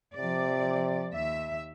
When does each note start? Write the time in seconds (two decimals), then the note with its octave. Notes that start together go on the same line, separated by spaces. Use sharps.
0.17 C3 F3 D5
1.13 D#2 E5